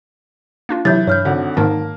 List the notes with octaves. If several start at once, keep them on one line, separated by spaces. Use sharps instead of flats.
A#3 D4 F4
C3 E3 F#3 E5 G6 A6
G2 C#5 F6 G6
G#1 D3
G#2 D#3 A#3 A5